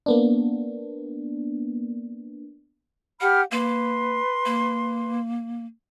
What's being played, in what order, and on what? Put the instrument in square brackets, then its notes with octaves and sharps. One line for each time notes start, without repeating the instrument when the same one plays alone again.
[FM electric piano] A#3 B3 D4
[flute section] G4 B5 F6 [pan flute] F#5
[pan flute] A#3 [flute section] B4 C6
[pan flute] A#3